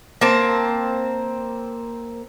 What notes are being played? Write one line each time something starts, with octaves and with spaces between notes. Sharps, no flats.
A#3 C4 A5